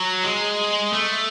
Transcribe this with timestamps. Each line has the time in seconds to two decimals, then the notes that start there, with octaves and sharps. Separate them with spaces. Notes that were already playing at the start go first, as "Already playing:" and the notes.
Already playing: F#3
0.24 G#3
0.93 A3